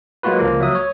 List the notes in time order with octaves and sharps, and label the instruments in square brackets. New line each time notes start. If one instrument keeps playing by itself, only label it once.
[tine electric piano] F#3 G#3 A#3 F4 F#4 B4
C#2 F3 A#3
F#3 E5 D#6
C#5